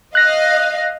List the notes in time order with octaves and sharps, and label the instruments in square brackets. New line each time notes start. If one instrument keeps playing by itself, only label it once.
[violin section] D#5 F5 [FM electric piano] F#6 A#6